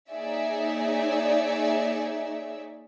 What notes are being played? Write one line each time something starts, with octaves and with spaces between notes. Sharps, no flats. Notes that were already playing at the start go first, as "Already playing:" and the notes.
A#3 D#4 G#4 C#5 D5 E5